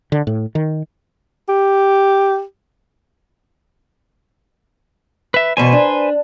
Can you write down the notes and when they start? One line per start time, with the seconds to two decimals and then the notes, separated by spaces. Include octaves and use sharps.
0.12 D3
0.27 A2
0.55 D#3
1.49 G4
5.34 B4 E5
5.57 E2 B2 B4 C5 G#5
5.72 D4